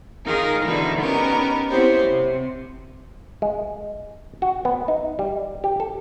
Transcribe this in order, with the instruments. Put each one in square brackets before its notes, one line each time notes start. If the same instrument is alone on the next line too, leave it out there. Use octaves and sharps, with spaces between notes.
[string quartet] D#3 D#4 F4 G#4 A#4
B2 D3 E3 D#4 E4
B3 C#4 D#4 G4 A#4
B3 C4 E4 G4 C5 C#5
C3
[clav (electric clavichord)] G#3
F#4
B3
D#4
G3
G4
A4